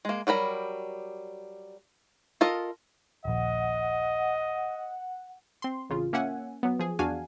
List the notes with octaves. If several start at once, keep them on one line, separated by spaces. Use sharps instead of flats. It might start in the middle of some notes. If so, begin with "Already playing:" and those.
G#3 A#3
F#3 G3 A#4 B5
F4 A4 A#4 D#5
D#1 A#1 D#5 F#5
C4 C6
A1 C#3 F4
A#3 C#4 E5 F#5 G#5
F#3 B3
F3 G#4
E2 D4 F#4 F5 G#5